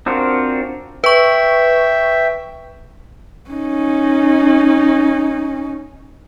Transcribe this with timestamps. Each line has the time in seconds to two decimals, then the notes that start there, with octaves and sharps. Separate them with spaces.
0.06 C4 D4 F4 F#4 A#4
1.04 B4 E5 G5 C#6
3.50 C#4 D#4